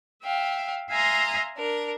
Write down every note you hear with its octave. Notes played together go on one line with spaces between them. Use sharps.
E5 F5 G5
E5 F5 G#5 A#5 C6 D#6
D4 A#4